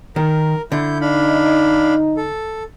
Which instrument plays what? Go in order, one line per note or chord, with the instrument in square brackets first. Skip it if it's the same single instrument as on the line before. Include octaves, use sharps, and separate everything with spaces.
[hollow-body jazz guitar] D#3 [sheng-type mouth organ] A#4
[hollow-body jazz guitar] D3 [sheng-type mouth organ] E4 G6
[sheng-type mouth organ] D4 F5 B5 [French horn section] D#4
[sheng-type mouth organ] A4